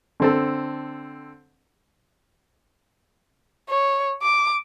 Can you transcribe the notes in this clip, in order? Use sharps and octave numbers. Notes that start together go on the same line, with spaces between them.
D3 C4 A4
C#5
D6